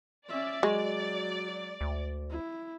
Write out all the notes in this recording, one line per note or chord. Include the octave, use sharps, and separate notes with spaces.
C#4 D5 E5
F#3 G#3 F#4
D2
E4